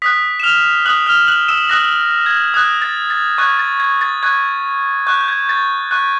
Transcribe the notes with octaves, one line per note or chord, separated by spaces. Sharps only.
D#6 F#6 B6
E7
F6 F7
D#6 F#6 F#7
F6 F7
F#6 F#7
E6 E7
D#6 F#6 A#6
G#6
D#6 F#6 G#6
A6
A6
C#6 F#6 G#6
A6
G#6
A6
C#6 F#6 G#6
C#6 F#6 G6
G6
G#6
A6
C#6 F#6